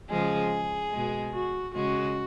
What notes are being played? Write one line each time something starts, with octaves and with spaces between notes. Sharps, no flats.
C#3 F3 G#3 G#4
B2 G#3
F#4
C#3 G#3 F#4